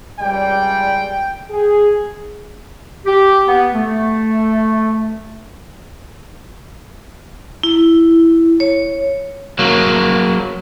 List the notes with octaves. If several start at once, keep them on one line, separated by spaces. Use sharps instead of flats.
C#2 G3 G5
G#4
G4
B3
A3
E4
C#5
F#3 A#3